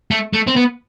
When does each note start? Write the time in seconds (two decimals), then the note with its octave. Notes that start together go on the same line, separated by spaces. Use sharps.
0.11 A3
0.33 A3
0.47 C4
0.56 B3